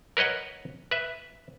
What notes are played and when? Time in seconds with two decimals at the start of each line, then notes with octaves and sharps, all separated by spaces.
0.17 A#4 B4 C#5 D#5 F#5
0.91 B4 E5